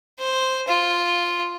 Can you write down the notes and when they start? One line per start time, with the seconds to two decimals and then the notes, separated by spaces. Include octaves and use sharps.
0.19 C5
0.68 F4